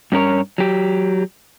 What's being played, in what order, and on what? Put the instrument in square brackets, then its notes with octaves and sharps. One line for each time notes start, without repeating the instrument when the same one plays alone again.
[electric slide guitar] G2 C#4 A#4 C#5
F#3 G4